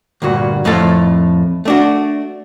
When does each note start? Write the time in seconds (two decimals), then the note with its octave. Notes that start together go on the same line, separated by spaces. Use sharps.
0.22 D2 G2 A#2 F#4
0.65 F2 A2 A3 F4 A4
1.65 A3 D4 F#4